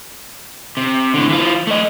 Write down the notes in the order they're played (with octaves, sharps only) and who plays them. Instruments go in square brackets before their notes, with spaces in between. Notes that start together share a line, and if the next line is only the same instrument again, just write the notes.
[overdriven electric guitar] C3
A2 D3
E3 F4
A3 D#5